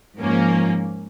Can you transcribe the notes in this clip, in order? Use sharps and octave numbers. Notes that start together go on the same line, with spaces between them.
G#2 F3 A#3 C#4